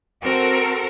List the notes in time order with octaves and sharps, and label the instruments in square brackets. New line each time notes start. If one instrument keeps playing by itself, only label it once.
[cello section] C4 F#4 A4 A#4